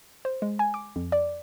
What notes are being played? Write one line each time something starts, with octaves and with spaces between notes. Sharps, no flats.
C5
G#3
G#5
D6
F2
D5